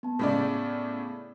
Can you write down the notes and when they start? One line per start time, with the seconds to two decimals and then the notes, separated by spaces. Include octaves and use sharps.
0.03 B3 A5
0.19 A2 C#3 D5